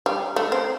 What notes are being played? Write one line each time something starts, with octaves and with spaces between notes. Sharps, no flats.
G3
A3
C4